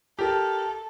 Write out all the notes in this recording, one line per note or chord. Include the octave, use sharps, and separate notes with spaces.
G4 A4 A#4